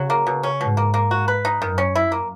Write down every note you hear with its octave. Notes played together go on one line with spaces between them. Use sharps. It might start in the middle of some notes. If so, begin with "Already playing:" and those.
Already playing: C#3 F#3
A#3
B2
C#4
G#2 B2
A#3
A#3
F#4
B4
D#4
F#2 D#3
C#4
E4
A#3